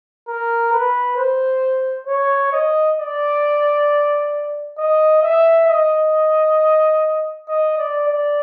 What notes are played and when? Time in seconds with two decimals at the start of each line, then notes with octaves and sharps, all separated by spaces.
0.28 A#4
0.73 B4
1.17 C5
2.07 C#5
2.52 D#5
2.98 D5
4.78 D#5
5.23 E5
5.68 D#5
7.48 D#5
7.78 D5
8.08 D5